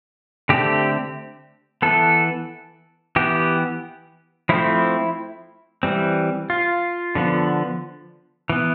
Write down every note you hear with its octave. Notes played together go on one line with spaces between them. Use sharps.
D3 A3 C4 G4
E3 B3 A4
E3 B3 G4
F3 A3 C4 E4
E3 G3 C4
F4
D3 F3 B3
E3 B3